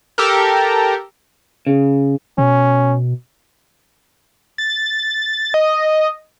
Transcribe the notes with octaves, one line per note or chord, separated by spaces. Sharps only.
G4 A4 A#4
C#3
B2 C#4
A6
D#5